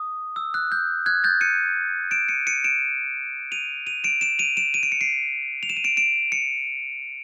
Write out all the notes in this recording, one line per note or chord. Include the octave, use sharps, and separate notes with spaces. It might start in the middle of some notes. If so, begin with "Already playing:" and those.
Already playing: D#6
E6
F#6
G6
F#6 G#6
G6 A6
C#7 D#7
D7 E7
C#7 D#7
C#7 D#7
D7 E7
D#7 F7
D#7 F7
D7 E7
D7 E7
D#7 F7
D7 E7
D#7
D7
C#7
C7 D7
F7
E7
D#7
D7 E7
D7 E7
C#7 D#7